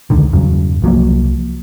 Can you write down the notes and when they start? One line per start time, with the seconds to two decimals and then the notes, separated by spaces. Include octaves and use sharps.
0.10 E1 C#2 D3 D#3
0.33 E2 G2 C#3 F#3
0.82 C2 F3 F#3 A#3